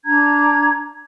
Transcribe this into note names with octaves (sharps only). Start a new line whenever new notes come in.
D4 A#5 G#6